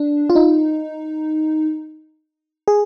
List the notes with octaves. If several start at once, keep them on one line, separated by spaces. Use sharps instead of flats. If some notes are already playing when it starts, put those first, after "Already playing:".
Already playing: D4
F4
D#4
G#4